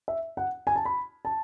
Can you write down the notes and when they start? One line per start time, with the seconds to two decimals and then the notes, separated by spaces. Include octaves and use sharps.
0.08 E5
0.37 F#5
0.67 G#5
0.76 A5
0.85 B5
1.25 A5